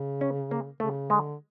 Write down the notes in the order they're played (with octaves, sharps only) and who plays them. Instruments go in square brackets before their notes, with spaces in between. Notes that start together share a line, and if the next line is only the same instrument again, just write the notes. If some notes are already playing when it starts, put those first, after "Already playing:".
Already playing: [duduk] C#3
[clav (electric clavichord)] C#4
A#3
[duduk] C#3 [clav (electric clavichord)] A3
[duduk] D3 [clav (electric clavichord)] G#3